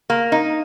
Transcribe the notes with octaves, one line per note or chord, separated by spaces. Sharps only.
A#3
D#4